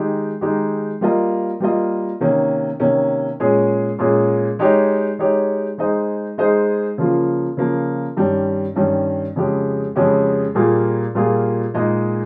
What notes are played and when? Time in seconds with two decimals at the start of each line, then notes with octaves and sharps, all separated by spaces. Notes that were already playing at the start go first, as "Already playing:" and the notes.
Already playing: D#3 G#3 D#4 G4
0.41 D#3 G#3 D#4 G4
1.01 G3 A#3 F4 A#4 D#5
1.60 G3 A#3 F4 A#4 D#5
2.20 C3 D#3 A#3 C#4
2.80 C3 D#3 A#3 C#4
3.40 A#2 G#3 C#4 G#4
3.99 A#2 G#3 C#4 G#4
4.59 G#3 D#4 G4 C#5
5.19 G#3 D#4 G4 C#5
5.78 G#3 D#4 G#4 C5 D#5
6.38 G#3 D#4 G#4 C5 D#5
6.98 C#3 F3 A#3 F4
7.57 C#3 F3 A#3 F4
8.17 G2 D#3 G3 C#4
8.76 G2 D#3 G3 C#4
9.36 F2 C#3 G#3 C#4 G4
9.95 F2 C#3 G#3 C#4 G4
10.55 A#2 G3 A#3 F4 G#4
11.15 A#2 G3 A#3 F4 G#4
11.74 A#2 G#3 D#4 G#4 D#5